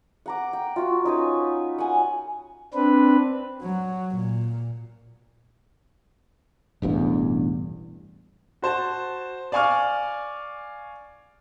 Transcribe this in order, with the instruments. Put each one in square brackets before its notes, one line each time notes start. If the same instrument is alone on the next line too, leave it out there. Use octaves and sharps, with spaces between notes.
[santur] F#5 A#5 D6
G5
F4 F#4
C#4 D#4 B4 C#5
F#5 G#5
[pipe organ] C4 D4 B4
[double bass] F#3
A#2
[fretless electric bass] E1 A1 E2 G2
[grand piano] F#4 C5 A5
D5 F5 G#5 C#6 D6 F6